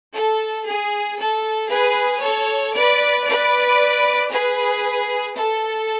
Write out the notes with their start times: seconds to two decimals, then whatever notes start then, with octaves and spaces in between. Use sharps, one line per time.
0.13 A4
0.65 G#4
1.19 A4
1.70 G#4 B4
2.22 A4 C#5
2.75 B4 D5
3.27 B4 D5
4.31 G#4 B4
5.37 A4